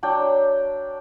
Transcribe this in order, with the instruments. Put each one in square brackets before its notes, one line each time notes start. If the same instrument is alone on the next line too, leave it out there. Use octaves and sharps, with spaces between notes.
[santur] F#3 D4 G5